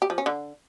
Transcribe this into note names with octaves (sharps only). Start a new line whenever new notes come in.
G4
F3
C#4
D3